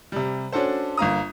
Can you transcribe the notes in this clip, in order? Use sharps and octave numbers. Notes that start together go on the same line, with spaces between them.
C3 G3
C#4 D4 F#4 A4 C5
G1 A#3 A#5 D#6